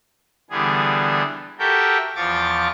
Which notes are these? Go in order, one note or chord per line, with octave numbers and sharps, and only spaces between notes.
D3 E3 G3 B3 G#4
F#4 G4 A4 A#4 E5 G5
E2 F3 F4 C#6 D6 A6